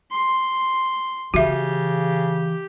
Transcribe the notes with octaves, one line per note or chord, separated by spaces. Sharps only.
C6
C#3 E3 F#4 G4 E5